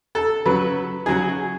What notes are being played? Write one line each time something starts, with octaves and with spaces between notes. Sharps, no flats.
A4
C#3 F#3 B4
C#3 F#3 G#4